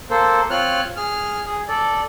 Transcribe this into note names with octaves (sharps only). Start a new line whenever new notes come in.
A#3 A4 C5
C4 F4 C#5 F6 F#6
G#4 F6
G#4
A4 D5